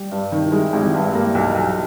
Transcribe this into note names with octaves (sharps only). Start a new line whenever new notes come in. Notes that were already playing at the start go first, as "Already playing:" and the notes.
Already playing: G3 G4
G2
D#3
E4
G3 G#3 G4
G#1
E3 E4
G2
G3 A#3 G4
B1
B1